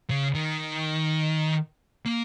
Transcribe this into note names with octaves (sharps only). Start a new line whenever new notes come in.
C#3
D#3
A#3